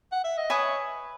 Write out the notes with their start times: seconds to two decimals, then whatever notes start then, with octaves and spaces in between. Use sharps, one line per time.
0.12 F#5
0.24 E5
0.38 D#5
0.50 B4 C#5 E5 G#5 D#6